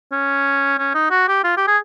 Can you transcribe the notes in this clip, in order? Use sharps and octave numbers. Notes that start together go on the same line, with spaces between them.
C#4
C#4
D#4
F#4
G4
F4
G4
G#4